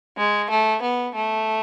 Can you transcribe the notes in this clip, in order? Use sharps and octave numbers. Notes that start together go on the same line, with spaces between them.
G#3
A3
B3
A3